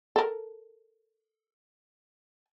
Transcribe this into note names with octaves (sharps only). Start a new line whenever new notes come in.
A4 A#4